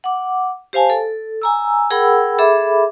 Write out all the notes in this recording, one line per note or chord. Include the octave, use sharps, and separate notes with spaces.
F#5 D6
G4 C5 F5 G#5 A5
A4
G#5 A#5 E6
G#4 A#4 F#5 G5 B5 E6
G#4 A4 E5 B5 D6